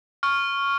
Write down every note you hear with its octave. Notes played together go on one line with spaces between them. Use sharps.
C#6 F6